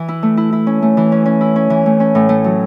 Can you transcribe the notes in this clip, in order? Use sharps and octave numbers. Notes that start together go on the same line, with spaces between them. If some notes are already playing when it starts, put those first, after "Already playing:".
Already playing: E3
E4
A3
E4
E4
C#4
A3
E3
C#4
C#4
E4
C#4
E3
A3
C#4
A2
A3
F#3